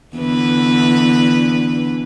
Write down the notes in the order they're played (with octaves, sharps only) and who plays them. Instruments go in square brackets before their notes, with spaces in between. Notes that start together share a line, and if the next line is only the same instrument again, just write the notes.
[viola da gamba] E2 D3 B4